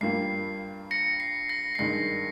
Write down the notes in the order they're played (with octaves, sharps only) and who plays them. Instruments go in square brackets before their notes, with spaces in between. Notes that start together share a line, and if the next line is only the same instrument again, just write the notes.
[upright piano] G2 G3 A#3 F4 [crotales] C7
[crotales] A#6 C#7
C7
A#6
C7
[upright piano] G2 D#3 G#3 [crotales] A#6